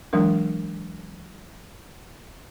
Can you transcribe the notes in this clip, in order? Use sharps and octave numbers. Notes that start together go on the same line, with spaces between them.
E3 F#3 G#3 D4 A#4